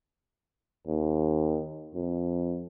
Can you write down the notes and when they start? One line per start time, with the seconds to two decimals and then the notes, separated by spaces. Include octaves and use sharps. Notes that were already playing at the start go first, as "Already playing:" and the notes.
0.87 D#2
1.95 F2